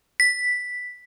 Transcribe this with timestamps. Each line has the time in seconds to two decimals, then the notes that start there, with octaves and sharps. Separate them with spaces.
0.20 B6